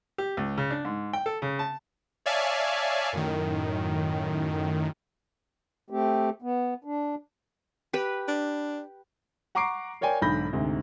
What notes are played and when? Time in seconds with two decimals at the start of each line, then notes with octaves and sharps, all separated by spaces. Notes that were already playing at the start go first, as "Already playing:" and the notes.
0.18 G4
0.37 C#2
0.58 C#3
0.71 D4
0.85 G#2
1.13 G5
1.26 A4
1.42 C#3
1.59 A5
2.26 C#5 D5 E5 F5 G#5 A5
3.13 F#2 A2 D#3
5.90 A3 C4 G4
6.42 B3
6.84 D4
7.93 G4 B4
8.28 D4
9.55 F#5 A#5 C#6 D6 C7 D7
10.01 A#4 C#5 D5 G5 G#5
10.21 B1 G#2 D3 B5 G6 A#6
10.53 D2 G#2 C3